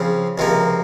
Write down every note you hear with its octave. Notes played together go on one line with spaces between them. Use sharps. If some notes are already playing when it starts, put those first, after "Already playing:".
Already playing: C#3 F3 C4
C#2 C3 F3 A#3